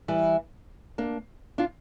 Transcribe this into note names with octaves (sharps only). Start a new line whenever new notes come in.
E3 G3
A#3 D4
D4 F4